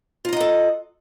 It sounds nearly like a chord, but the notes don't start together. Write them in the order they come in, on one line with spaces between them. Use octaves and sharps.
F4 A#5 D#5 F#5 A4